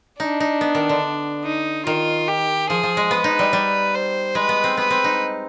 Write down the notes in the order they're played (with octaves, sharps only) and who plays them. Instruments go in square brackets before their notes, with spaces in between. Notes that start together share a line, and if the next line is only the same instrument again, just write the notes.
[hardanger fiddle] D4 [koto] D#4
[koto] D#4
B3
D#3
D3
[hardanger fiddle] D#4
[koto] D#3 [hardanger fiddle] F4
[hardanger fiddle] G4
[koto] F3 [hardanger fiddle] G#4
[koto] F3
G#3
[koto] B3 [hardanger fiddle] B4
[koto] D#4
G3
G3
[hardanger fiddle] C5
[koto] G#3 [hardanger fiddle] B4
[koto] B3
C4
[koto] B3 [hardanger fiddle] B4
[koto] C4
D#4